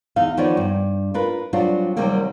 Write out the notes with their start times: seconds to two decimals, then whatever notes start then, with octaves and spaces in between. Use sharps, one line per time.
0.16 E2 D#4 F5
0.37 D#3 F3 B3 D#4 C#5 D5
0.57 G2
1.14 F4 A#4 B4
1.53 F#3 G3 C4 D4 F4 F#4
1.97 D#2 C3 F#3 G3 A#3